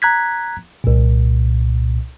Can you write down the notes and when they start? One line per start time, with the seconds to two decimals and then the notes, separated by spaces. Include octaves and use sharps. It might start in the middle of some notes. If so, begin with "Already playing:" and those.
0.02 A#5 F#6 G#6 B6
0.84 C2 A#2